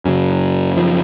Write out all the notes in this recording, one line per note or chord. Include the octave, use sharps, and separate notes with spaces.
F#2 C#3 F#3
F3